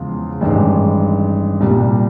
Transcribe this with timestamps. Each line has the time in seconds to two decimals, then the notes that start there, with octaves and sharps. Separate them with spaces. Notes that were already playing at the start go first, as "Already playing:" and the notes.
Already playing: E2 C#3 F3 G#3 F4
0.41 A1 G2 D#3 G#3
1.61 C2 A#2 G3